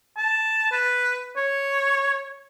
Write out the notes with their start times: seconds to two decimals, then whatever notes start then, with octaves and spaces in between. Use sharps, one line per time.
0.17 A5
0.71 B4
1.36 C#5